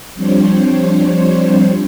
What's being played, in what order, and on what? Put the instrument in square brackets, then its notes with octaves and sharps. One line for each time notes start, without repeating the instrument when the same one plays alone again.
[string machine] F3 G3 C4 D4 C5 C#5